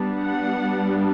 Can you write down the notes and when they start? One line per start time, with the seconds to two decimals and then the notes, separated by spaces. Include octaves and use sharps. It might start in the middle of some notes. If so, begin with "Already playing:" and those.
Already playing: G3 B3 D4
0.19 F#5